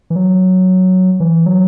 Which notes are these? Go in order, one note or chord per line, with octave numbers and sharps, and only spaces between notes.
E3
F#3
E3
F#3